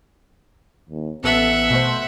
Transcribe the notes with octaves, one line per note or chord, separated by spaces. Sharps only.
D#2
A1 B3 A4 E5 F#5 E6
B2 A3 C5